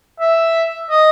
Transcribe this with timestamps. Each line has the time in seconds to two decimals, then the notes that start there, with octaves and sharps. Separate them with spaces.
0.20 E5
0.90 D#5